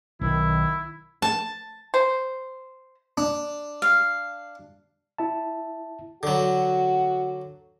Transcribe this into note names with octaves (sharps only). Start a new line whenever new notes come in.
B1 D#3 E4
A5
C5
D4
F5
E4 E5 A5
D3 F#3 F#4